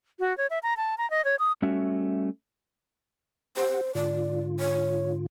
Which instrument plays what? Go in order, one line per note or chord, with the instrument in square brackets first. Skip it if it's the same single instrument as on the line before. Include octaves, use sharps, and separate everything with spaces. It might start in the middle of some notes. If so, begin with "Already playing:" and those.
[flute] F#4
C#5
E5
A#5
A5
A#5
D#5
C#5
D#6
[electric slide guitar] G3 A3 C#4 F#4 E5
[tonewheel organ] G4 F#5 [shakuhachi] C5
[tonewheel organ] G#2 D3 F4 [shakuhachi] D5
[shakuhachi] C#5